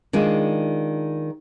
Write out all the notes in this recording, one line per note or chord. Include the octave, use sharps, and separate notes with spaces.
D#3 G#3 D4 F4